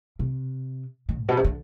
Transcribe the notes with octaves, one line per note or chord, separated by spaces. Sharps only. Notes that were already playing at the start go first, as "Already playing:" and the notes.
C3
D#3
G#2
B2
C3
D3